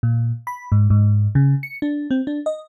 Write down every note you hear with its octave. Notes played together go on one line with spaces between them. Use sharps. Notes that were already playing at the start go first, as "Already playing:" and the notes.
A#2
B5
G#2
G#2
C#3
C#7
D4
C4
D4
D#5